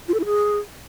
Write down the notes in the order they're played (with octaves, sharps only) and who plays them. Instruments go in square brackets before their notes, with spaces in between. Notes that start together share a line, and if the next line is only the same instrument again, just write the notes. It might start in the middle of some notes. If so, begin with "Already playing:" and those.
[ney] F4
A4
E4
G#4